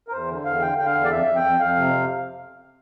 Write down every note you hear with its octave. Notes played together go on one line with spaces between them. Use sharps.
A#4
E2 C5
D3
E2 F5
D3 G5
D3 G5
F5
E2
D5
F2 E5
F2
G5
F2
F2 F5
C3